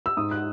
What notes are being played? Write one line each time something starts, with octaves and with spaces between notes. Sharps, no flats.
E6
G#2 D#6
F#6